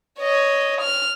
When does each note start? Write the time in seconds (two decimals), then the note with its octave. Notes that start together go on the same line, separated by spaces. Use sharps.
0.20 C#5 D#5
0.81 F6